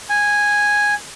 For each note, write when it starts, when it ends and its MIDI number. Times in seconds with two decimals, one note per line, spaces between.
0.10 0.94 80